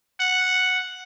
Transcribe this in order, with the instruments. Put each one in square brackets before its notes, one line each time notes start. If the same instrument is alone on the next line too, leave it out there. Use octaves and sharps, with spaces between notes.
[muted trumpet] F#5